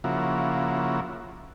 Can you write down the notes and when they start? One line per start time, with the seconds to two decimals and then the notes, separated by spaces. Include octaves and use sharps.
0.04 C#3 F3 A#3 E4 F#4